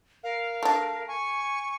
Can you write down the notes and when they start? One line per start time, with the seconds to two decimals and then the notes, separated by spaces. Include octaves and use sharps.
0.24 A#4 F5
0.63 A3 D4
1.08 G#5 C#6